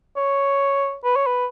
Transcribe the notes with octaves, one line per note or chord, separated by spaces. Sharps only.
C#5
B4
C#5
B4